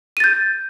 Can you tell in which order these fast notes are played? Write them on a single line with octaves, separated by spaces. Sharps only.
D#7 A6 G6